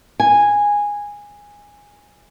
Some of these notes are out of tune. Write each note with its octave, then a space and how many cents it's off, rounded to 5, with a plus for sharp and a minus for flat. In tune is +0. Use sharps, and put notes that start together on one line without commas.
G#5 -10